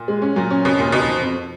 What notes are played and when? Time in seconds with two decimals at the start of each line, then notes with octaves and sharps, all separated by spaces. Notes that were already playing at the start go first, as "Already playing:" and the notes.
Already playing: A#2
0.08 G#3
0.22 C#4
0.36 A#2 F#3
0.50 C#4
0.65 B2 C#4
0.78 D#2 A#2
0.92 B2 D#4
1.08 F3
1.22 F2